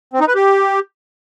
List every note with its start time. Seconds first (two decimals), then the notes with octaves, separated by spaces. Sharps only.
0.13 C4
0.21 D#4
0.28 B4
0.35 G4